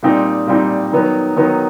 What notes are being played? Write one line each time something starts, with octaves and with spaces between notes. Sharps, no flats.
A#2 G3 C4 D#4
A#2 G3 C4 D#4
D#3 F#3 B3 D#4
D#3 F#3 B3 D#4